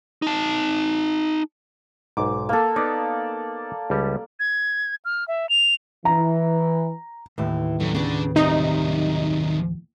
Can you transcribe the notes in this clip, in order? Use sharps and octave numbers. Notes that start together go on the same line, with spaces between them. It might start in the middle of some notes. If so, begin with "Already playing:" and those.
D#4 A5
B1 G#2 D6
A#3 A4
B3 D#4 D5
C#2 G3 C#4
G#6
F6
E5
F7
E3 A#5
D#2 A2 E3
F#2 D3
C#3 B3 D4 F#5
C3 D#3 F#3 G3 D#4 D#5